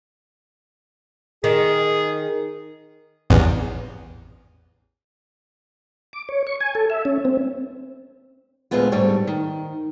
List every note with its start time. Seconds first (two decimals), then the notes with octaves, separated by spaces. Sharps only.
1.44 D#3 G#4
3.30 A1 E2
6.13 D6
6.29 C#5
6.47 C#6
6.60 G#5
6.75 A4
6.90 E5
7.05 C#4
7.25 C4
8.71 D2 A#2 D3 G#3 B3 F4
8.92 D2 G#2 G3 A3 D4 C#5
9.27 D#3